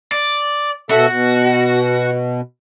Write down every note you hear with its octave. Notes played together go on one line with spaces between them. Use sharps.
D5
B2 F#4 A4 E5
B2